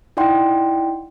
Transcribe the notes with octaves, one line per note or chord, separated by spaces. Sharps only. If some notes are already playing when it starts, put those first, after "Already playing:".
D#4 E4 D5 F#5 G5 C6